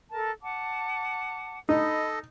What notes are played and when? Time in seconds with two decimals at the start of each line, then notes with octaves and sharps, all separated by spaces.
0.12 A4 A#4 A5
0.42 F#5 A5 D6
1.69 D#4 A4 D#5 B5